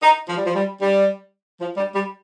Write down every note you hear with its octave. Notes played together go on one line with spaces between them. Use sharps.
D#4
F3
G3
F3
G3
G3
F3
G3
G3